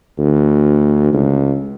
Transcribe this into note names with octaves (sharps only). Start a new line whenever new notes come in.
D2
C#2